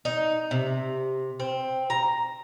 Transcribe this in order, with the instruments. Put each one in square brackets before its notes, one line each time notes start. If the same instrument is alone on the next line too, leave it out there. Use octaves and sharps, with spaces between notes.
[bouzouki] D#4
C3
C4
A#5